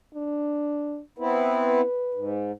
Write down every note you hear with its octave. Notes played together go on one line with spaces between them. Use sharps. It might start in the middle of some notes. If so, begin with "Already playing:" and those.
D4
B3 C4 E4 B4
G#2